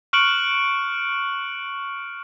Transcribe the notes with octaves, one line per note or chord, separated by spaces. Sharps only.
C#6 F6 F#6 C#7 D7 F#7